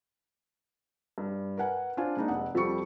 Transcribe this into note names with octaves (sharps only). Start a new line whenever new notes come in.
G2
A#4 B4 F#5 G#5
D4 F4 C5 G#5
G#3 A#3 D4 D#4
F1 D#5 F#5
F2 F3 G3 A4 C#6 C#7